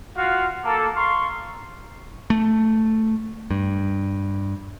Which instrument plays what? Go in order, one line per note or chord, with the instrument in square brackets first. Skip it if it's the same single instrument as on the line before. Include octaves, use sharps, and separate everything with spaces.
[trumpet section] F4 F#4 F5 F#5
A#3 A4
F5 A#5 C6 C#6
[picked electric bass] A3
G2